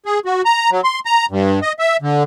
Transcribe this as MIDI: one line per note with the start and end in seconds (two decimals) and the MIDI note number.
0.06 0.19 68
0.25 0.42 66
0.45 0.70 82
0.71 0.81 54
0.84 0.99 84
1.06 1.26 82
1.31 1.60 43
1.62 1.73 75
1.79 1.97 76
2.02 2.23 50